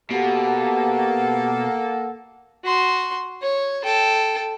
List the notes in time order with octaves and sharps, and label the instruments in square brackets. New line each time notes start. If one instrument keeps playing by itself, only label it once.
[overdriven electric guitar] B2 [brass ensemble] A#3 A4 [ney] G4 [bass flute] F#5
[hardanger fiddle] F#4 C6
C#5
A4 G5